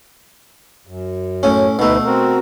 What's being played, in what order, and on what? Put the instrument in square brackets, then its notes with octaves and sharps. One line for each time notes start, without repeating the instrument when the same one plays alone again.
[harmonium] F#2
[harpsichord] A2 C#4
[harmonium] D2 D#4 B4 [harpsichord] B2 A3
[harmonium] C4 F#4 A#4